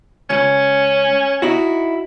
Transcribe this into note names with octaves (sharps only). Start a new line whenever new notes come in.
C#2 C#4
D#4 E4 F#4